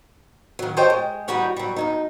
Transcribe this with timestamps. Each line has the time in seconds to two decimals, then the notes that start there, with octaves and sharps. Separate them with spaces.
0.59 D#3 F#3
0.77 G4 A4 C5 C#5 D#5 G5
0.90 G#3
1.28 E3 G3 D#4 F#4 G4 C#5
1.57 F#3 G3
1.76 D2 G2 D#4